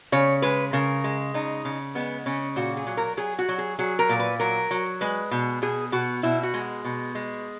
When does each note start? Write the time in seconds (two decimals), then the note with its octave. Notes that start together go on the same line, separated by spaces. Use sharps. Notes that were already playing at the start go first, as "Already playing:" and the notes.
0.12 C#3 C#5
0.42 G#3 B4
0.73 C#3 A#4
1.04 G#3
1.34 C#3 D#4
1.65 C#3
1.95 G#3 B3
2.26 C#3 C#4
2.56 A#2 F#4
2.77 G#4
2.87 F#3
2.97 A#4
3.17 F#3 G#4
3.39 F#4
3.49 F#3
3.58 G#4
3.79 F#3 G#4
3.99 A#4
4.09 A#2
4.19 B4
4.40 F#3 A#4
4.71 F#3
5.01 G#3 B4
5.31 B2
5.62 B2 G#4
5.92 B2 F#4
6.23 B2 E4
6.43 F#4
6.54 G#3
6.85 B2
7.15 G#3